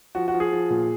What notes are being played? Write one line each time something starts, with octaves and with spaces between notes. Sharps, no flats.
F3 F#4
F#4
F3
G#4
F3
A#2